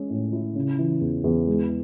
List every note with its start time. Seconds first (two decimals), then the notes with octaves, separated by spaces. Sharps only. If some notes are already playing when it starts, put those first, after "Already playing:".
Already playing: G#3 C#4
0.10 A2
0.33 E4
0.56 C#3
0.79 E3
1.01 E2
1.24 E2
1.47 G#3